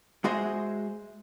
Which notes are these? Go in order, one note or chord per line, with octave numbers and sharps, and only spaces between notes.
G#3 F#4 G#4 C5 D#5 E5